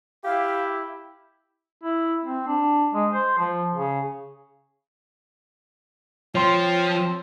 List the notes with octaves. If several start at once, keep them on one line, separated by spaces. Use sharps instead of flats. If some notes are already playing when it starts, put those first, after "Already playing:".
E4 G4 F5
E4
C4
D4
G#3
C5
F3
C#3
F3 C4 C#5 C6